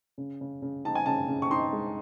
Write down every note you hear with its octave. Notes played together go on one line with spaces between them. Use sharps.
C#3
C#3
C#3
D#4 A5
G#5
C#3 A5
C#3
C#6
D#4 C6
G#3